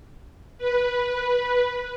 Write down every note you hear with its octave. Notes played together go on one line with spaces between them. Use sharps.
B4